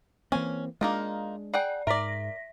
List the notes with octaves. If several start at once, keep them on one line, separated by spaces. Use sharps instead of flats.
E3 A#3 C4 C#4 G#5
G#3 A#3 D4 D#4 F4
G#4 D5 F#5 G5
G#2 A#4 D5 E5 A#6 B6